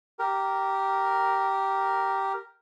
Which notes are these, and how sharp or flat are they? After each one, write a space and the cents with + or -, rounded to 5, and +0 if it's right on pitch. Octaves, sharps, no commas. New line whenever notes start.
G4 -10 A#4 +0